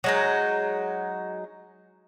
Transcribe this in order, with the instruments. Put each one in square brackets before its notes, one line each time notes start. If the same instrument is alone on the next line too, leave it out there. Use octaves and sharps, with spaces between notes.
[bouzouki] F#3 G#3 D#4